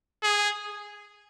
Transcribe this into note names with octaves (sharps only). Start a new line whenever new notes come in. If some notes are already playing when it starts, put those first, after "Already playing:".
G#4